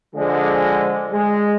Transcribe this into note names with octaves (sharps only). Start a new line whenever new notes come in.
D3 F3 G#3
G#3